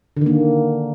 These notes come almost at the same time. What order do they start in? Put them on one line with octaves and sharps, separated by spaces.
D3 D#3 A#3